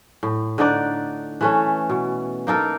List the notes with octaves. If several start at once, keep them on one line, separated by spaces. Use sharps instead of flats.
A2
D3 D4 D#4 D5
E3 A3 C#4
B2
A#3 D#4 A4 A#4